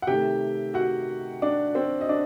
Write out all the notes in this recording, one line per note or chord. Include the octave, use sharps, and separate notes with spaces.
F#5
C3 D#3 A3 G4 G5
F#4 F#5
D4 D5
C4 C5
D#5
D4 D5